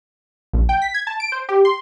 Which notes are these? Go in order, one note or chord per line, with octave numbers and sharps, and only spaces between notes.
A#1
G5
B6
G#6
A5
D7
C5
G4
C6